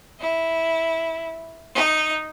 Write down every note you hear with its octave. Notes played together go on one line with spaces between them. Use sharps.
E4
D#4